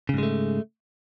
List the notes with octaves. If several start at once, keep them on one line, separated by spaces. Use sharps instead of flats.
G#2 C#3 G#3 A3